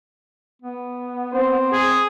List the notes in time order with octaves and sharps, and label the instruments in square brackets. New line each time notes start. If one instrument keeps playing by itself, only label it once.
[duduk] B3
[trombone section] C4 C5
[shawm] G#4